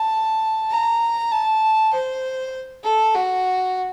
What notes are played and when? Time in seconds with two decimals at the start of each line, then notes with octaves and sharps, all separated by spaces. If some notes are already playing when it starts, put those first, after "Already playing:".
Already playing: A5
0.70 A#5
1.32 A5
1.93 C5
2.84 A4
3.15 F#4